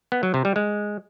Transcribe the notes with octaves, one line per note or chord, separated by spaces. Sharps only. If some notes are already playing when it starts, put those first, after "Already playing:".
B3
F#3
C3
G3
G#3